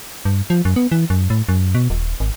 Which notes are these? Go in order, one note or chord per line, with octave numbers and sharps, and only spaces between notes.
G2
F3
F#2
B3
E3
F#2
A2
F#2
B2
D#1
G#1